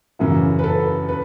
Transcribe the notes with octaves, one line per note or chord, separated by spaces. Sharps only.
F#2 C#3 E3 E4
B4
A4
B4